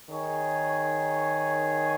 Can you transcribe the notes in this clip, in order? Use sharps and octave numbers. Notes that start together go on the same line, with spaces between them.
D#3 G#4 C#5